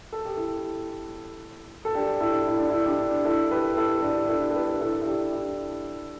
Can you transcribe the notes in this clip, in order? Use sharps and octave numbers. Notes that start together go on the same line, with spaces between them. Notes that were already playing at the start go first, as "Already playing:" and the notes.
A4
G4
E4 A4
A4
D4 G4
E4 A4
E4
D4
E4
D4 G4
E4 A4
G4 B4
E4 A4
A4
D4 G4
E4 A4
A4
G4 B4
G4
E4 A4
E4
D4 G4
E4